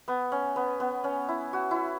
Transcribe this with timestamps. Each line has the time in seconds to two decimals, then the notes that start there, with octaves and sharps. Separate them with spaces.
0.08 B3
0.32 C#4
0.56 B3
0.80 B3
1.04 C#4
1.28 E4
1.53 F#4
1.71 E4